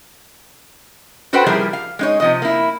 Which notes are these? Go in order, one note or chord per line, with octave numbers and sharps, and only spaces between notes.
F#4 A4 B4 C5 F#5 G5
F3 G3 E4 G4 G#4 A#4
F5
G#3 D#4 C#5
C3 F3 D#5
A#3 E4